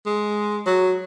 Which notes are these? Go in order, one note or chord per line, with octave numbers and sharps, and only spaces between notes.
G#3
F#3